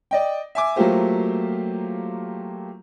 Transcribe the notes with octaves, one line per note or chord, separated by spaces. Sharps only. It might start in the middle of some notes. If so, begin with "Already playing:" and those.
D5 D#5 G5
E5 G#5 D6
F#3 A3 A#3 F4 G4 C5